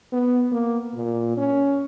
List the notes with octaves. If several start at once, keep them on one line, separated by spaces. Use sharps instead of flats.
B3
A#3
A#2
C#4